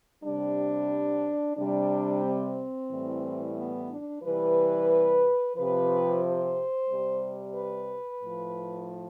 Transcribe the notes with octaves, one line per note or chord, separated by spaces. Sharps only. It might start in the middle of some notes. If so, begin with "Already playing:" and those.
C3 G3 D4
C3 G3 D4
C4
A2 E3 G3
B3
D4
C3 E3 G3 B4
C3 F3 B4
C5
C3 G3
B4
A2 F3